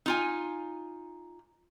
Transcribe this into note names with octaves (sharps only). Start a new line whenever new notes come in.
D#4 F4 G#5